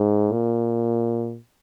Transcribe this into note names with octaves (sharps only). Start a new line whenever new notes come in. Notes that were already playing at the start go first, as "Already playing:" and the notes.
Already playing: G#2
A#2